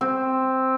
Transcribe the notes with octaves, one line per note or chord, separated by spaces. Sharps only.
C4